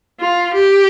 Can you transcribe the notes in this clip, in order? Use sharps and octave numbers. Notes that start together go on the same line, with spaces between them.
F4
G4